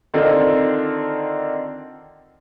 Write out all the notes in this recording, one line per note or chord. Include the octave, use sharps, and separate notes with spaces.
D3 D#3 C4 D4 F4 A4